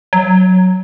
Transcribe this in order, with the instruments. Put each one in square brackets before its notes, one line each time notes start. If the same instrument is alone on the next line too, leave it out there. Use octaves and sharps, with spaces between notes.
[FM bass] F#3